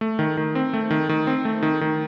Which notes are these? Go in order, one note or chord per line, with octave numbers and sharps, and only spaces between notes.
A3
D#3
D#3
C4
A3
D#3
D#3
C4
A3
D#3
D#3